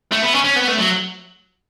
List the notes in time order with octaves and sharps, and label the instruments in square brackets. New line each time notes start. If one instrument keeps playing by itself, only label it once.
[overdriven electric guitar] A3
B3
C#4
C#4
B3
A3
F#3